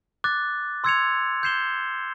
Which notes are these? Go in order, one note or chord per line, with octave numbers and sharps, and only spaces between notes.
D6 F#6 A6
C6 E6 G#6 C#7 F7
G6 C7 E7 G7